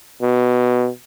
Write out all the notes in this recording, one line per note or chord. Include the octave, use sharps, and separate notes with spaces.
B2